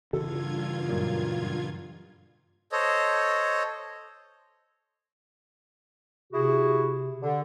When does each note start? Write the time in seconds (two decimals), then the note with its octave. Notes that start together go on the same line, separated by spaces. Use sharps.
0.13 G2 C#3 E3 F4 A4 G#6
0.88 F#2 A#2
2.72 A4 C5 C#5 D#5
6.33 C3 E4 F#4 G#4
7.21 D3